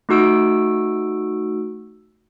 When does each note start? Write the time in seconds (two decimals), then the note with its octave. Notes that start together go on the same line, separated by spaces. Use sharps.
0.09 A3 D#4 F#4 E6 D7